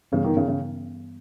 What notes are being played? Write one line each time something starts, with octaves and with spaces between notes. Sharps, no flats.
G2 C#3 E3 G3 B3
D#3
C#3
C#3